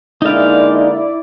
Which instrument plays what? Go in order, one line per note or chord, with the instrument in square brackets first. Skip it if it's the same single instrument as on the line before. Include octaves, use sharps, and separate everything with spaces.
[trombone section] D3 G#3 A#3 [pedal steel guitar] D#4 F5 [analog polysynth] E4 D5